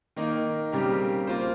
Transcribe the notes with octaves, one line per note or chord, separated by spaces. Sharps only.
D#3 A#3 D#4
C#3 G3 C4 G4 A#4
A#3 F4 C5